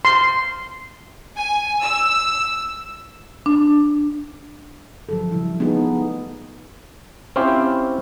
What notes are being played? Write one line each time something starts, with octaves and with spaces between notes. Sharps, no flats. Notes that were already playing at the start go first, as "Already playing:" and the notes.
C6
G#5
E6
D4
F3 F#3 A4
C#3 G3 E4
A3 B3 D#4 F4 G#4
C4 C#4 E4 F4 G4 C5